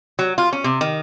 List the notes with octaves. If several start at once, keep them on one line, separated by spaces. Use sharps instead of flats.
F#3
F4
C#4
C3
D#3